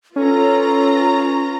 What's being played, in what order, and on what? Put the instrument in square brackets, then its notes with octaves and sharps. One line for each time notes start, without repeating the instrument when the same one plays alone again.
[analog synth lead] C#4 [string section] F4 B4 A#5 [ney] A4